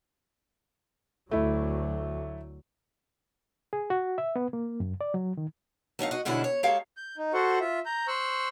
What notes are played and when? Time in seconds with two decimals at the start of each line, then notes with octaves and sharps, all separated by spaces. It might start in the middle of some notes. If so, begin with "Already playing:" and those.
1.31 D2 F#3 A3 E4
3.73 G#4
3.90 F#4
4.18 E5
4.36 B3
4.53 A#3
4.80 F#2
5.01 D5
5.14 F#3
5.37 D#3
5.99 F#3 A3 D#4 F5
6.11 F#4 D#5
6.25 B2 D3 G3 G#3 C#4 E4
6.44 C#5
6.63 G#3 A#3 G4 A4 C#5 F5
6.97 G6
7.18 D#4
7.34 F#4 A4 C5 F#5 C#6
7.61 F4 E5
7.86 A#5 G6
8.08 C5 C#6 E6 F#6